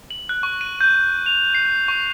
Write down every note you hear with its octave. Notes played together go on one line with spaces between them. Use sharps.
F#7
F#6
C#6
D#7
G6
F7
C7
C#6